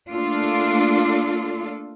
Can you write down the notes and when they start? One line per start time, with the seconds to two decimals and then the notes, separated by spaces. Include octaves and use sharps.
0.10 A3 A#3 D4 F4 A4